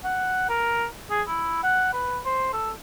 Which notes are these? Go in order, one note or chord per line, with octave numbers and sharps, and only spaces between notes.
F#5
A#4
G#4
E4
F#5
B4
C5
A4